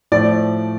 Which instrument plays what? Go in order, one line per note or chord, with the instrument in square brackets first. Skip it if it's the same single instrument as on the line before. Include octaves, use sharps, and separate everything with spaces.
[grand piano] A2 F3 A3 D5